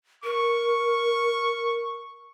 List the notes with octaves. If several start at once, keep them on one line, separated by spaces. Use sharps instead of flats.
A#4 C#6